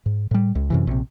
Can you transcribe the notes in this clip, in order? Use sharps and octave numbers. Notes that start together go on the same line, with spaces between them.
G#2
A2 G3
C#2
F#2 C3 E3
A#1 C3